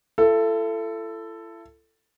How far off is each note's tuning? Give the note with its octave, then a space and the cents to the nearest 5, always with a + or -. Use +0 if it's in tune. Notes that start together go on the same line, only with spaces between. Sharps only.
E4 +40 A4 +10